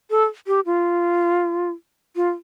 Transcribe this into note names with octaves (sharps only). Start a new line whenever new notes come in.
A4
G4
F4
F4